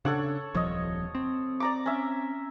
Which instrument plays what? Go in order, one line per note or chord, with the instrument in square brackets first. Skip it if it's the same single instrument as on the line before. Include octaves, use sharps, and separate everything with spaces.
[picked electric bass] C#3 D4 [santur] A4 C#5 F#5
[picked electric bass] D#1 C2 F3 [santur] C#5 D#5
[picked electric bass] C4
[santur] D5 A#5 D6
C#4 E5